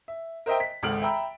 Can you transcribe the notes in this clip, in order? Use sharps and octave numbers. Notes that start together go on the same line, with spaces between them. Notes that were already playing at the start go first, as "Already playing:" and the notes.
E5
A#4 C5 D#5 E5 G5
B6
G#1 C#2 A4 F6 D7 F#7
E5 G5 A#5 B5 E6